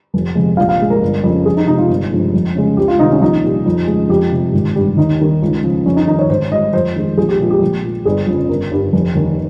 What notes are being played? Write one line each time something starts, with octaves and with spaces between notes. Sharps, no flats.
F1
F2 C3 F3 G#3
A#1 F5
F5
A#2 G#3
A#4
G1
F2 C#3
F2 G#4
D#4
C3 F3 G#3 D#4
F4
G1
G2 F3 G#3
F2
C#3 G#3
C#2 G4
F4
C3 D#3 D#4
C#4
F4
A#1 D#4
A#2 G3
F2
C#3 G#3
F2 G4
C3 G3
G#1
G2 G3
D#2 D#4
D#3 G3
C#2
C#3 F3
F2 C#4
D#4
D#3 G3 D#4
C#5
G#1 C5
G#2 G3 D#5
F2 C5
D#3 G#3
A#1 G#4
G4
A#2 F3 G#3
G4
A#1
A#2 F3
G1 G#4
F2 C#3 F3
G1 A#4
G2 G3
F1
D#2 D#3